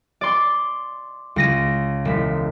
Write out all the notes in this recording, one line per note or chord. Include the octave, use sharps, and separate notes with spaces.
D5 C6
C#2 A#6 D#7
E1 B6